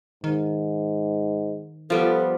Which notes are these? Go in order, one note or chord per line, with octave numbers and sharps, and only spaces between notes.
G#2 D#3
F3 G3 B3 A4